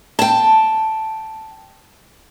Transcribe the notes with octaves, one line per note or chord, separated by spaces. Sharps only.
G5 A5